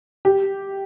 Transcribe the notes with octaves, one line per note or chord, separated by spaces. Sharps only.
G4